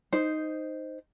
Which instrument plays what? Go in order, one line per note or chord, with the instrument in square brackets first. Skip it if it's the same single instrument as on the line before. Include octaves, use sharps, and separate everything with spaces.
[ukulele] D#4 C5